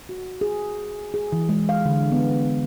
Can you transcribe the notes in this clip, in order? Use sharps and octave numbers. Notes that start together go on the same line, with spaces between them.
F#4
G#4
G#4
E3
G#3
F5
D3
B3